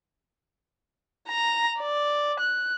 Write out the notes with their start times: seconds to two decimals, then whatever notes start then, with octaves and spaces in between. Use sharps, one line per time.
1.29 A#5
1.80 D5
2.40 F#6